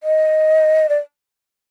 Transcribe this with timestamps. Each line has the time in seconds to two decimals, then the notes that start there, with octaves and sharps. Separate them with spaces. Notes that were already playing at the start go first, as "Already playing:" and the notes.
0.03 D#5
0.89 D5